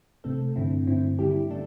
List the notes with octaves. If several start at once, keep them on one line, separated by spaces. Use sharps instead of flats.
C3 A3 C4 A4
G2 D3 C4 E4
G2 D3 C4 E4
D3 G3 E4 G4
D3 A3 D4 A4